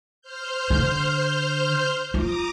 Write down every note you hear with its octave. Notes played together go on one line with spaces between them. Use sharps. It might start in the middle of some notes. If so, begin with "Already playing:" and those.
C5 F6 G6
D3
F4 A#5 D6 D#6